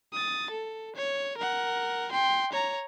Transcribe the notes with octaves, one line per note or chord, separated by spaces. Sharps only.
D#6 A6
A4
C#5
A#4 F#5
G5 C6
C#5 A#5